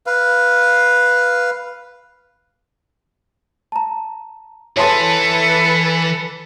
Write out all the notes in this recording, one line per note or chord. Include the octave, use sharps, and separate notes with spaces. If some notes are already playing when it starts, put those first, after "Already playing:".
B4 F5
A5 A#5
E3 A4 B4 C#5 G#5 A5 C6